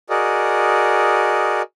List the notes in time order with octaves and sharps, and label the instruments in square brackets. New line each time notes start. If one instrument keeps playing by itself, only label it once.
[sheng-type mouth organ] F#4 G#4 A#4 D5 D#5